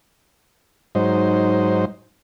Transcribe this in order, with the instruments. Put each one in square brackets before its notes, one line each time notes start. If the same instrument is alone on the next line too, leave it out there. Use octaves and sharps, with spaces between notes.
[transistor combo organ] G#2 F#3 D#4 C5